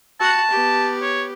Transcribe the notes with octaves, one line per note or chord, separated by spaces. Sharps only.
F#4 F#5 A5
B3 G4
C#5